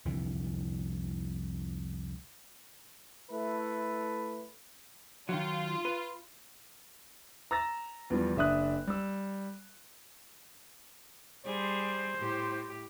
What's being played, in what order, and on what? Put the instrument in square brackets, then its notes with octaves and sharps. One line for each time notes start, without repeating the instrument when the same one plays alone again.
[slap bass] C2 F2 D3 E3
[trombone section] A3 E4 A4 B4
[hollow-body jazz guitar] D#3 F#3 [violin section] F4
[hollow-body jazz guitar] B4
[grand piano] A#5 E6 A6 A#6
E2 E3 F3 G3
F#1 D4 E5 D#6 F#6
G3 E6
[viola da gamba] G3 G#4 [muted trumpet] C5
[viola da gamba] A2 G4